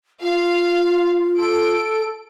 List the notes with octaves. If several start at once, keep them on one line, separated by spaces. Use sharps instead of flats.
F4 F5
A4 D7